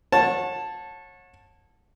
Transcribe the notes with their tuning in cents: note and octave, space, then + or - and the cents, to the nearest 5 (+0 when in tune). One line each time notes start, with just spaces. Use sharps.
C#5 -25 F#5 -30 A5 +0